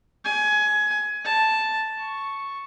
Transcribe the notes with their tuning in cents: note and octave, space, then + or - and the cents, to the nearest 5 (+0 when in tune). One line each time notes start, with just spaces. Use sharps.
G#5 +20
A5 +0
C#6 +0